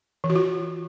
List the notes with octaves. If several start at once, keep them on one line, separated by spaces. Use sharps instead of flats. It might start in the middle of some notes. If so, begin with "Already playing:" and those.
E3
F#4
F4